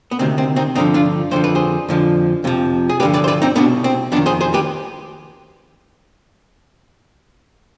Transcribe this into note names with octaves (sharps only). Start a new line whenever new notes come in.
B3
D2 C3 D#3 C4
C4
C4 D#4
G2 D3 F3 C4 D#4
D4 F4
F2 D3 F3 C5
B4
G#4 C5
F2 D3 F3
F2 C3 F3
G#4
G2 D3 F3 G4 B4
B4 D5
C5
B4 D5
C4 D#4
C2 B2 B3 D4
C4
F2 D#3 B3 D4
G#4 C5
G#4 C5
G4 B4